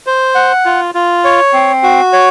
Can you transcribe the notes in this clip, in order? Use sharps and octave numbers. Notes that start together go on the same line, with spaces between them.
C5
F#5
F4
F4
C#5
C4
F#4
C#5